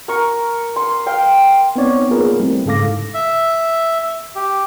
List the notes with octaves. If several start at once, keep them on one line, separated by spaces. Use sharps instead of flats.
A#4 C#6
C6
F5 G5
B3 C4 D#4 C#5 D5
A#3 B3 F4 G#4 A#4 B4
G3 A3 C4 E4
G#2 C#3 A4 F5 D6 A#6
E5
G4